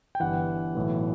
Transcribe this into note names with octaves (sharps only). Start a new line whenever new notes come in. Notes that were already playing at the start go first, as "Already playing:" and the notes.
G5
G1 G2 E3 F#5
B1 A2 E3